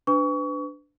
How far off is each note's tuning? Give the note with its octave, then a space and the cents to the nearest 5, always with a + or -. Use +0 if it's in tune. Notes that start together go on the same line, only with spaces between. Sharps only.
D4 +0 B4 +30 C#6 +30